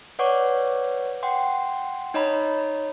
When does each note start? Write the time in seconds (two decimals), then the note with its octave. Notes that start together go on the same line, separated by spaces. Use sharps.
0.19 B4 C#5 D5 F#5 C#6 D6
1.23 F#5 G5 C6
2.14 D#4 C#5 D#5 A#5 B5